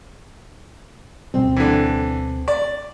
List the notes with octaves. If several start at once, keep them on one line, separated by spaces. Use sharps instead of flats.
D2 B2 G3 C4
D3 E3
D5